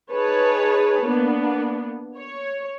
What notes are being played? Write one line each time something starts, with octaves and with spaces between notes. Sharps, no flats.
D#4 G#4 B4 C#5 A5
A#3 B3 D4
C#5